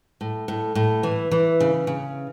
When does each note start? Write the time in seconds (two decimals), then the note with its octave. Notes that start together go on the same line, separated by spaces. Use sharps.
0.21 A2
0.48 A2
0.75 A2
1.03 E3
1.31 E3
1.60 C#3
1.87 C#3